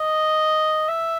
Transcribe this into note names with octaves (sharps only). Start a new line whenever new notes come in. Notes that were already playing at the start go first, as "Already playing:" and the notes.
Already playing: D#5
E5